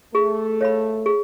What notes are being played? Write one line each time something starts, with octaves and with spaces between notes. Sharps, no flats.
A3 G#4
C#5 F5 B5
G#4